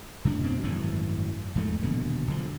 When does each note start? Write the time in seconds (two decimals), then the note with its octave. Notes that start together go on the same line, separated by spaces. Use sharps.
0.25 F2 A2 C#3 D4
0.43 B2 C4
0.63 G#1 F#2 A2 E3
1.55 E2 G#2 F3 A3
1.83 D#1 B2 D3
2.28 B1 D3 F3